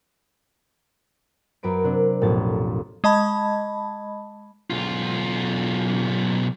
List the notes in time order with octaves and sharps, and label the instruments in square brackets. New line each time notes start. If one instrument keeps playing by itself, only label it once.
[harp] F#2 A#4 B4 D7
C3 D4
A1 F2 B2 A6
[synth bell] G#3 D#5 A5 B5
[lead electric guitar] B1 F4